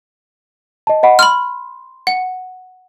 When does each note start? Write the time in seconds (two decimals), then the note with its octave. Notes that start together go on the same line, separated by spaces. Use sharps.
0.87 D#5 A5
1.03 D#5 F#5 B5
1.19 B5 C6 F6
2.07 F#5